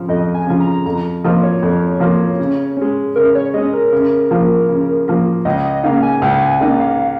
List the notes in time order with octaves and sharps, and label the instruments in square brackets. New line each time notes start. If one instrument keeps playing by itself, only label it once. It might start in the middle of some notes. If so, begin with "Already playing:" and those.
Already playing: [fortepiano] C#3 F3
[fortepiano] F2 [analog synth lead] D#5
[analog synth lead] G#5
[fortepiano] C#3 F3
[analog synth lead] A#5
[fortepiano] F2 [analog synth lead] A#5
[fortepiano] F3 A#3 F4 [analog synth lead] D#5
[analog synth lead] C#5
[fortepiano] F2
F3 A#3 F4
C#3
G#3 C#4
[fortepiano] C#3 [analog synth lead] A#4
[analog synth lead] C#5
[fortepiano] G#3 C#4 [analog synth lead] D#5
[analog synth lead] A#4
[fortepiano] C#3
F3 A#3
C#3
F3 A#3
[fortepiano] C#2 [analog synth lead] D#5
[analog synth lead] D#5
[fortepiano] C#3 A#3 D#4 [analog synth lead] F5
[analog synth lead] G#5
[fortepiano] C#2 [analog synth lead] G#5
[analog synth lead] G#5
[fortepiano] C#3 A#3 D#4 [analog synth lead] D#5
[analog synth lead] F5